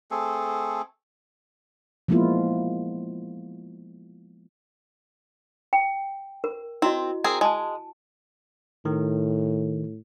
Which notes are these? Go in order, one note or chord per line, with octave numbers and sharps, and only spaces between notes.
A3 C4 G#4 A4
F3 G#3 A#3 B3 E4 F4
G5
A#4
C4 E4 F#4 D#5
C4 G#4 A#4
G#3 G#5 A5
A2 D#3